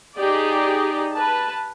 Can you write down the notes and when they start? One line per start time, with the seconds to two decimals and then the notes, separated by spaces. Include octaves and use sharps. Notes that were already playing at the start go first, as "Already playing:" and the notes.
0.17 D#4 G4 G#4 D5
1.13 B4 A5